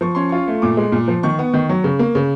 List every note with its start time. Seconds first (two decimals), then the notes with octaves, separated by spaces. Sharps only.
0.01 F3 C#6
0.15 C#4 C6
0.29 F4 C#6
0.48 A3
0.62 A#2 D6
0.77 G#3
0.92 A#2
1.08 F3
1.23 D#3 C#6
1.39 B3
1.54 D#3
1.69 F#3
1.84 C#3
1.99 A#3
2.15 C#3